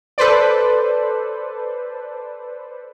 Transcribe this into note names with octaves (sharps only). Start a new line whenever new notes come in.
A4 B4 C5 D5